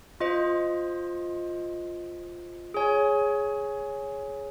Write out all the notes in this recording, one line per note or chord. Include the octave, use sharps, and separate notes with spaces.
F4 C5 D#5
G#4 C#5 G#5